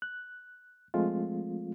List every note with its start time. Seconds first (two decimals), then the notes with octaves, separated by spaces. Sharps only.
0.02 F#6
0.94 F3 G#3 A3 C4 F4